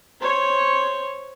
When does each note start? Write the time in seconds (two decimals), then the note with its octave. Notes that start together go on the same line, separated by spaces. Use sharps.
0.20 C5 C#5